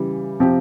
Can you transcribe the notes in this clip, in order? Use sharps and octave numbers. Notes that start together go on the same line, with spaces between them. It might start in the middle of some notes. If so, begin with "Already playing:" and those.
Already playing: C#3 E3 G3
C3 F3 C4 G4